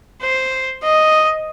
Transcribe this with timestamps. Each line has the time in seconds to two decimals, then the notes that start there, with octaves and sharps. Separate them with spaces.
0.22 C5
0.83 D#5